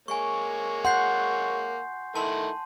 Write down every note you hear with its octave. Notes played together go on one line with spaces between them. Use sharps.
G#3 A#3 C#5 G#5 C#6
F#5 C6 G6 C7
D#3 A3 E4 A5 C6